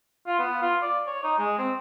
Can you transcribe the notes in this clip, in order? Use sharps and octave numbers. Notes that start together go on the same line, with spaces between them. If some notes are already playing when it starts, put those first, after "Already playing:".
F4
B3
F4
D5
C#5
D#4
G#3
C4